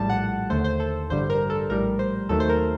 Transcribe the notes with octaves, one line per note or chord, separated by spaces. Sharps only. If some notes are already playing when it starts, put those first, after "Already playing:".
Already playing: A#1 A2 G3 A5
F#5
D#2 D3 A3 C5
C5
A4
A1 G2 D3 G3 C5
A#4
A4
A#1 A2 G3 A#4
C5
D#2 D#3 F#3 A3 A4
C5
A#4